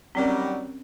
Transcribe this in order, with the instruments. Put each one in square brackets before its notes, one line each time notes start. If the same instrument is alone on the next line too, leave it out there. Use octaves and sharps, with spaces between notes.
[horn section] D#3 F#3 G3 [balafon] C4 C#4 A#4